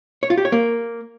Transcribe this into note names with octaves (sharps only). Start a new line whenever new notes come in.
C#5
F4
G4
C#5
A#3